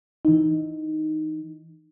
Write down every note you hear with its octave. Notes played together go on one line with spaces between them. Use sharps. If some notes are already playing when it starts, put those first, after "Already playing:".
E3 D#4